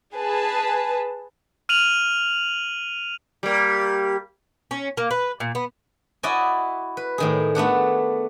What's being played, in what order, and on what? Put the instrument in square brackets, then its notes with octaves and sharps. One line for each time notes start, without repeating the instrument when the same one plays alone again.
[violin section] G#4 B4 A5
[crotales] F6 D#7 F7 F#7
[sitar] G3 A#3
[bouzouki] C#4
A#3
B4
A#2
B3
[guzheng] E4 F#4 D5 D#5 G#5
B4
A2 D#3 G#4
A3 B3 D4 F#5